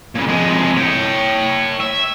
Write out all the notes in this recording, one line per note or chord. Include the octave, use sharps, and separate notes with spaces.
A#2 C#3
F2 G#3
C#5 G5
E5